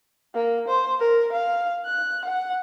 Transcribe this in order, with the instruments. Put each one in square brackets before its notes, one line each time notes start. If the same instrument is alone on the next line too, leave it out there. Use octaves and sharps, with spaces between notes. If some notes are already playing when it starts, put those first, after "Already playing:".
[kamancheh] A#3
C5
A#4
F5
F#6
F#5